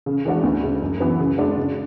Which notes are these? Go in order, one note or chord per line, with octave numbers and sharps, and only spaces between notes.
C#3
E3 G#3 D4 F#4
D2
C#3 G#3
F#2
E3 B3 F#4
C#3
G#3 D4 F#4
C#3